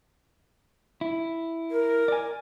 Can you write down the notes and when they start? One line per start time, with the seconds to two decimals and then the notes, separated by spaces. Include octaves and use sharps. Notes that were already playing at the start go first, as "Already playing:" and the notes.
1.01 E4
1.71 A#4
2.08 D5 G#5